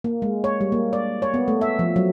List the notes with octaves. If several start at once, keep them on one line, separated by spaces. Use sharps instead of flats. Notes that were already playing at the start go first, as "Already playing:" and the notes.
A#3
G#3
C#5
G3
A#3
D5
C#5
B3
A3
E5
F3
F#3